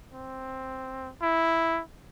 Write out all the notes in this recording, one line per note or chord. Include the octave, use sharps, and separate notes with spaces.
C4
E4